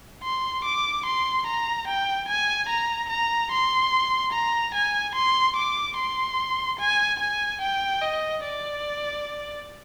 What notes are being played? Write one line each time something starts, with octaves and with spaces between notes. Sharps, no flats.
C6
D6
C6
A#5
G5
G#5
A#5
A#5
C6
A#5
G#5
C6
D6
C6
G#5
G#5
G5
D#5
D5